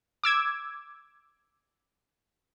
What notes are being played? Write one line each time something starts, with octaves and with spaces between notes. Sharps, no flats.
D6 E6 G#6